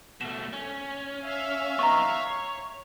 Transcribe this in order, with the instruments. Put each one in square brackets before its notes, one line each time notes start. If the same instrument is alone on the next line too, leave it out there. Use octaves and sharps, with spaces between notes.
[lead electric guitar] B2 A3 [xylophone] E7
[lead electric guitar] C#4
[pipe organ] E5 F5
[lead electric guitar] B3 D#4 [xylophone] A#5 C#6
[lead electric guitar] C#5